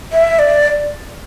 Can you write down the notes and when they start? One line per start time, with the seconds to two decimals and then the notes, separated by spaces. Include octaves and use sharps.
0.12 E5
0.39 D5